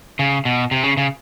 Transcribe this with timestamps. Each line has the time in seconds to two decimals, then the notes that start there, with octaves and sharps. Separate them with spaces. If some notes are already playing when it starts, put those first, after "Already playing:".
0.19 C#3
0.45 B2
0.71 C3
0.84 C#3
0.97 C#3